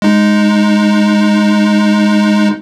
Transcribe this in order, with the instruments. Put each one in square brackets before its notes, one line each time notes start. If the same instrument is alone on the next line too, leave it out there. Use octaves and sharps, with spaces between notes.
[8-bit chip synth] G#3 D#4